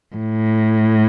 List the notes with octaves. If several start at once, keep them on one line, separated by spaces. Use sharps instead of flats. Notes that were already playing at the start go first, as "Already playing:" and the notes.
A2